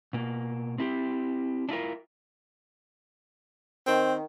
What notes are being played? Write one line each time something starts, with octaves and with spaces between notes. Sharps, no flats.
B2 A#3
C4 E4 G4
D4 E4 F4 A#4
D#3 C4